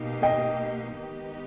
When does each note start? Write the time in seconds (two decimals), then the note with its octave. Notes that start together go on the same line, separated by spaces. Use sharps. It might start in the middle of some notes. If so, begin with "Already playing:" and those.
Already playing: B2 A#3 D#4 G4
0.22 D#5 G5
0.95 D#3 G#3 B3 D#4 G4